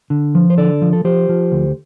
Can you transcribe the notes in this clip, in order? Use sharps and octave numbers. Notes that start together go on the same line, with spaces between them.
D3
F3
C5
D3 A4 D5
F3
A4
F3 G4 C5
F3
D2